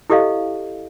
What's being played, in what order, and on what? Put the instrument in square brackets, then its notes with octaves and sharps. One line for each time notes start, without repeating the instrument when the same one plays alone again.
[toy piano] E4 G4 A4 D#5 F5